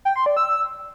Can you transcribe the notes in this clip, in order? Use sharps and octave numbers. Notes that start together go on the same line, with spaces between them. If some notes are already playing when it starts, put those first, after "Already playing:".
G5
C6
D5
E6